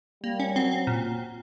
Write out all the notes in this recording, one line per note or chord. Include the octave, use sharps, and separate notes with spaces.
G3 A#3
C#4
F#3 C4
C4
A#2